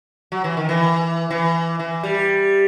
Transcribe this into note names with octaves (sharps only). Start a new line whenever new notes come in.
F#3
E3
D#3
E3
E3
E3
G3